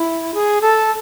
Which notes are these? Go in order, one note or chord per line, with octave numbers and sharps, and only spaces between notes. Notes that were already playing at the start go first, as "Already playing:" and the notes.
Already playing: E4
G#4
A4